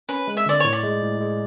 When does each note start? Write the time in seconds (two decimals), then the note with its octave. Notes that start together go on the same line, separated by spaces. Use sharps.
0.09 C#4 B4
0.27 G#3
0.37 E5
0.46 D3 D5
0.60 A2 C#5
0.73 D5
0.83 G#3
1.02 A2
1.20 G#3